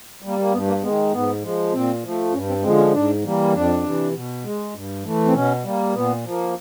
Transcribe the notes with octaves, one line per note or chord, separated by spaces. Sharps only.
G3 A#3
A#3
G2 B3
A#3
D#3 G#3 B3
G#2 B3
F3 G#3
A#2 C4
F3 A3
G2 C#4
C4
D3 F3 G#3 C4
C#4
G#2 D4
E3 G3 A#3
F2 D4
C3 E3
B2
G#3
G2
E3 A3
C4
B2 C#4
G3 A#3
A#2 B3
F3 A#3